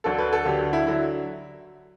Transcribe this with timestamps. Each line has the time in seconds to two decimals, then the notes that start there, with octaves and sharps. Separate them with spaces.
0.04 D2 D3 F#3 A4
0.19 B4
0.33 A4
0.45 D2 D3 F#3 G4
0.73 E4
0.87 D3 F#3 E4